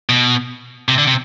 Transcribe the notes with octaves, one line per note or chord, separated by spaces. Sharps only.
B2
C3
D3
C3